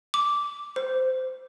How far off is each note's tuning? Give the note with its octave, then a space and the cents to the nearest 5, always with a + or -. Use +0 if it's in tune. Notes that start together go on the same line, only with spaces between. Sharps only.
D6 -10
C5 -15